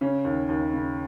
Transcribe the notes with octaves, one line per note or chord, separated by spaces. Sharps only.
C#3 C#4
D#2
D#2
C#3